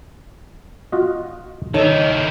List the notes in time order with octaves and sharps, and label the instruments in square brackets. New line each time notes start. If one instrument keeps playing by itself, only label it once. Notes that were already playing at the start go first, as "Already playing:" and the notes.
[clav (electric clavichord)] F4 F#4 D#5
[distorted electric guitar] D#3 E4 [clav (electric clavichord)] D#4 A4 [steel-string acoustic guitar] C#5 D#5